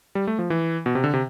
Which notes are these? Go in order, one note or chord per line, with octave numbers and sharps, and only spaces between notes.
G3
A3
F3
E3
B2
C3
D3
C3